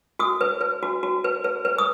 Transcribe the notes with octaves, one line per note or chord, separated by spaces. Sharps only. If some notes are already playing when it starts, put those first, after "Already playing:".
F#4 D#6
B4
B4
F#4
F#4
B4
B4
B4
D#6